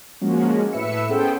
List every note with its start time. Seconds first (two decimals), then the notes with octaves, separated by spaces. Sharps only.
0.21 F3 G#3 A#3 C#4 F#4
0.73 A2 B4 E5 E6 C#7
1.09 B3 C#4 G#4 A4 C5 G5